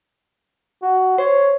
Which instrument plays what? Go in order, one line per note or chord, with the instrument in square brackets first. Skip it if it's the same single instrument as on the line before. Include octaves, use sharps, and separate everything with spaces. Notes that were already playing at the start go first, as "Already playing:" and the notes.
[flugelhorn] F#4
[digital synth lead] C5 [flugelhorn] C#5